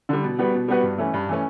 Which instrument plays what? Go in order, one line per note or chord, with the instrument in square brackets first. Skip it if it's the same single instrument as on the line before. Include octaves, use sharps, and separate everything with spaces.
[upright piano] D3 G3
B2
G3 B3 F#4 B4
B2
G3 B3 F#4 B4
G2
E3 A3 C#4
G2
E3 A3 C#4